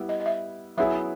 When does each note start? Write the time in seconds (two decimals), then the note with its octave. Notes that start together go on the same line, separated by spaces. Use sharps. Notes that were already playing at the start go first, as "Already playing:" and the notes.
Already playing: G3 B3 E4
0.09 D#5
0.20 D#5
0.26 E5
0.77 F#3 B3 E4 G#4 E5